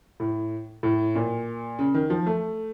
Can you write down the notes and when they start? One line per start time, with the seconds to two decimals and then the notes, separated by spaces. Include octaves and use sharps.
0.20 A2
0.83 A2
1.15 A#2
1.79 C#3
1.94 D#3
2.10 F3
2.26 A3